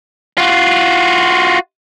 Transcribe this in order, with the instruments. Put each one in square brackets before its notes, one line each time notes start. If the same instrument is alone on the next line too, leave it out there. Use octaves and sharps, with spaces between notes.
[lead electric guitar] F4 F#4